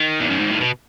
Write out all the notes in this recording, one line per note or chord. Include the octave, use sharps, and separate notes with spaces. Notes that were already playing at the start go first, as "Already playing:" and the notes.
Already playing: D#3
E2
F#2
G#2
A2
B2